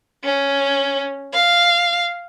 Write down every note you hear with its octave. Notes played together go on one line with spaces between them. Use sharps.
C#4
F5